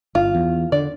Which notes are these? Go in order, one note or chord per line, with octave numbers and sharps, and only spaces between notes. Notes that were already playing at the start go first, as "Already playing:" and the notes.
G1 F4
E2
D3 D5